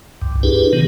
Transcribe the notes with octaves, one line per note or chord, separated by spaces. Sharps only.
C2 G2
D4 E4 G4 G#4 B4
C3 D#3 B3